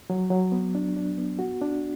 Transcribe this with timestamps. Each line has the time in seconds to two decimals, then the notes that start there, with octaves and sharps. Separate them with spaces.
0.10 F#3
0.30 F#3
0.52 B3
0.75 D4
0.97 D4
1.18 B3
1.39 F#4
1.62 D4